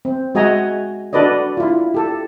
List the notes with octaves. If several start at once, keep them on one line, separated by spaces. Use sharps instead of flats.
C4
G#3 F#4 D#5 E5 G#5 A#5
D4 F#4 A4 B4 D5 D#5
E4 F4
G4 A4